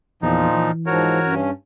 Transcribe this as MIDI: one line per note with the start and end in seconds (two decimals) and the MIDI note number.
0.22 0.48 40
0.22 0.71 46
0.22 0.71 53
0.22 0.71 63
0.52 1.45 52
0.86 1.19 44
0.86 1.19 53
0.86 1.35 66
0.86 1.35 70
0.86 1.35 73
1.25 1.51 43
1.25 1.51 61